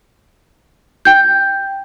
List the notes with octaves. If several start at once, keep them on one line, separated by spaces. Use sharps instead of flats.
G5 G6